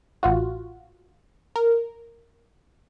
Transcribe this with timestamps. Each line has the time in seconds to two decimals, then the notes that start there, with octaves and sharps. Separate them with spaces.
0.23 A1 F4 F#4
1.56 A#4